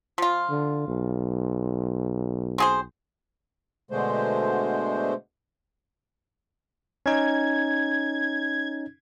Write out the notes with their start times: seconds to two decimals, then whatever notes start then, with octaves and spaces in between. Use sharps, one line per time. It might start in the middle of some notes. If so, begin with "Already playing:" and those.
0.18 F3 F4
0.50 D3
0.88 B1
2.58 C4 G#4 C5
3.91 B2 D3 G#3 A3 C5
7.06 C#4 D#4 G#6